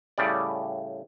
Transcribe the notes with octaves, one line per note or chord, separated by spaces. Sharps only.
A2 C#3 G3 D5